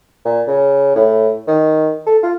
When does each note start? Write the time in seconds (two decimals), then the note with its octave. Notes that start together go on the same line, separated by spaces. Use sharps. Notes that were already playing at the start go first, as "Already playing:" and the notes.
0.25 A#2
0.47 C#3
0.96 A2
1.48 D#3
2.07 A4
2.23 F4